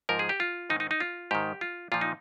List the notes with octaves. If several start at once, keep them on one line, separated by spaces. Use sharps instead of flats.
G#2 F3 A#4
G#4
G4
F4
G#2 D#3 D#4
D#4
D#4
F4
G#2 D#3 G4
F4
A#2 F3 F4
D#4